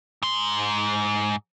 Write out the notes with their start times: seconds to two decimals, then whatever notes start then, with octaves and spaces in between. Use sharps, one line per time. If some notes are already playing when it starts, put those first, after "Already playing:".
0.22 G#2 C6